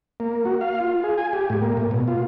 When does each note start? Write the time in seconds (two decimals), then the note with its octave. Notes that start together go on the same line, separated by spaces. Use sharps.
0.20 A#3
0.45 F#4
0.61 F5
0.80 F4
1.04 G#4
1.17 G#5
1.33 G4
1.50 A2
1.62 A#3
1.77 A2
1.91 B2
2.08 F4